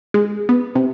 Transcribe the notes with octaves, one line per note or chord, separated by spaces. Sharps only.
G#3
B3
C3